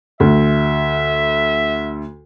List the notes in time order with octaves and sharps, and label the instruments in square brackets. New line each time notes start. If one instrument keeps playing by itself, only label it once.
[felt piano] D2 [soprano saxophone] E5